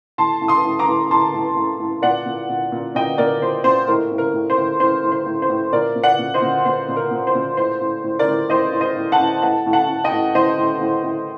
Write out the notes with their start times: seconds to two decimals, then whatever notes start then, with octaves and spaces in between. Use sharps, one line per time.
0.18 A2 A5 C6
0.41 A2
0.48 C6 D#6
0.65 A2
0.79 A#5 D6
0.88 A2
1.10 A2 A5 C6
1.34 A2
1.57 A2
1.80 A2
2.02 A#2 D5 F#5
2.26 A#2
2.49 A#2
2.72 A#2
2.95 A#2 D#5 G5
3.18 A#2 A#4 D5
3.42 A#2 C5
3.64 A#2 C5
3.88 A2 A#4
4.11 A2
4.18 A#4
4.34 A2
4.50 C5
4.58 A2
4.80 A2 C5
5.04 A2
5.12 C5
5.26 A2
5.42 C5
5.50 A2
5.73 A#2 A#4 D5
5.96 A#2
6.04 D5 F#5
6.19 A#2
6.34 C5 D#5
6.42 A#2
6.65 A#2 C5
6.88 A#2
6.96 A#4
7.11 A#2
7.27 C5
7.35 A#2
7.57 A2 C5
7.81 A2
8.04 A2
8.19 A#4 D5
8.27 A2
8.50 A2 C5 D#5
8.73 A2
8.81 C5 D#5
8.96 A2
9.12 F#5 A5
9.20 A2
9.42 A2 F#5 A5
9.66 A2
9.73 F#5 A5
9.89 A2
10.04 D#5 G5
10.12 A2
10.35 A2 C5 D#5
10.58 A2
10.81 A2
11.04 A2